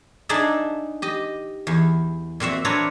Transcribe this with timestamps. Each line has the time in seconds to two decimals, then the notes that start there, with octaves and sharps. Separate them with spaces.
0.29 D4 D#4 G#4 D5 E5
1.02 G4 D#5
1.67 E2
2.40 A#2 C4 F#4 E5
2.65 C4 D4 F4 B4 C#5 A#5